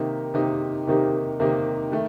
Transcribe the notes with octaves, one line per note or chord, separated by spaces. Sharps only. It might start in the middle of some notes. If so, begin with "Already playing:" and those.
Already playing: C3 D#3 A#3 D#4 G4
C3 D#3 A#3 D#4 G4
C3 D#3 A#3 D#4 G4
C3 D#3 A#3 D#4 G4
D#3 A3